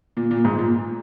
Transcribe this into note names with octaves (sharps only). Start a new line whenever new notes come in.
A#2
A#2
G#2
A#2